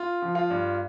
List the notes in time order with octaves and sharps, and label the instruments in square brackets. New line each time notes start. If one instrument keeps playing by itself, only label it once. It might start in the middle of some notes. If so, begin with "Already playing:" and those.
Already playing: [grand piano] F4
F3
F4
G2